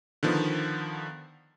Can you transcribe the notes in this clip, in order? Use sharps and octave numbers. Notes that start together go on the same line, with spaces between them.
D3 D#3 F3 B3